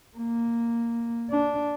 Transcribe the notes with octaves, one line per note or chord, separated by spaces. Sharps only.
A#3
D4